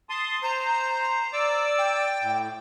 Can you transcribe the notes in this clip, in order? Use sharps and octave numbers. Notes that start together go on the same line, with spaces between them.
A5 C6 D#6
C5 A#5
D5 D6 E6
G5
A2